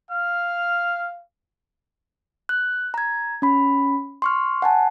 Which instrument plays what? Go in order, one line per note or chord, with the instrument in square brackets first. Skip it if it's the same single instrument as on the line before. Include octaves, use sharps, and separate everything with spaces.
[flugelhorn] F5 [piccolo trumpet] F6
[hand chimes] F#6
A#5 G#6
C#4 B5
C6 C#6 F6
F#5 G#5 A5